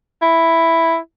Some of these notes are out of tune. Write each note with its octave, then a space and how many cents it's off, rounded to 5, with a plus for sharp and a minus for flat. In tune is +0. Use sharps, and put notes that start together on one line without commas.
E4 +0